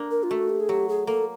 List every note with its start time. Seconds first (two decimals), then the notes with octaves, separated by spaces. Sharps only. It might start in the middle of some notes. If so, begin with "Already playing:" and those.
Already playing: A#3 D4
0.11 A#4
0.23 F4
0.30 A3 F#4
0.49 G4
0.60 G#4
0.69 F#3 G4
0.89 G#4
1.07 A#3 A4